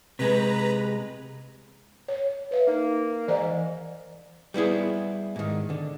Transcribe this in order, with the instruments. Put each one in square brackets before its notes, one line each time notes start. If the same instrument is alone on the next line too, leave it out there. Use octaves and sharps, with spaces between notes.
[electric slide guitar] C3 G#3 [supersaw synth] B4 A#5
[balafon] C#5
B4 E5 F5
[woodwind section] A#3 [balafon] D#4
[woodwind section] G#2 [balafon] E3 D5 A#5
[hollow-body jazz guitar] G3 B3 E4 G#4
G#2 D#3
D3